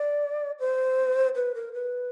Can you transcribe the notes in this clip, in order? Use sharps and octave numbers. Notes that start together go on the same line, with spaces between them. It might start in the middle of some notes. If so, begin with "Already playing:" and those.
Already playing: D5
C5
B4
A#4
B4